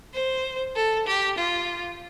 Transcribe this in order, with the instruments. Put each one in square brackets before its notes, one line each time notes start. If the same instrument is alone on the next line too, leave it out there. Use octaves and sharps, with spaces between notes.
[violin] C5
A4
G4
F4